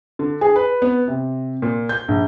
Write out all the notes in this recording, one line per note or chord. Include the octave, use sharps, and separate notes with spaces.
D3
G#4
B4
B3
C3
A#2
G6
A#1